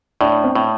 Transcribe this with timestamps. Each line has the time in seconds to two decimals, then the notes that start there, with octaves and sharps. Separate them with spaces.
0.21 A2 D4
0.44 C4
0.55 A2